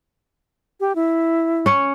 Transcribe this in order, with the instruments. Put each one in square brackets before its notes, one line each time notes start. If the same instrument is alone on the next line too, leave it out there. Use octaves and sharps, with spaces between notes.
[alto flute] G4
E4
[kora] C#4 C#5